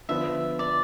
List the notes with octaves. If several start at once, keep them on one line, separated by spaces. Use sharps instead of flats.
D3 F3 B3 E5
D5